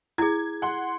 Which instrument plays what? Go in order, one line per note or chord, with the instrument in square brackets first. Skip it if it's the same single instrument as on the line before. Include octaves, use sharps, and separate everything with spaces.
[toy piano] E4 G#4 [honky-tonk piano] G#6
[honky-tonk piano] F#5 C6